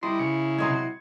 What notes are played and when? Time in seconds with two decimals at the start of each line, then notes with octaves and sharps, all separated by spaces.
0.03 G3 E4 D#5 C6
0.19 C#3 C#7
0.58 C3 F#3 G#3 C6 D#6 G#6